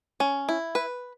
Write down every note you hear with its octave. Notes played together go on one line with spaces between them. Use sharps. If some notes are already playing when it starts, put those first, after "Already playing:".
C#4
E4
B4